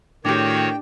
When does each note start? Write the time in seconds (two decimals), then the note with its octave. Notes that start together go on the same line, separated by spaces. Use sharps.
0.25 A2 D#3 D4 F#4 G4 C#5 G5